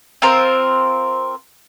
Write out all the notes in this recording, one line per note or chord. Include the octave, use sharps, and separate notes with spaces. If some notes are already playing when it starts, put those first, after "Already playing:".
C4 F4 A#4 C5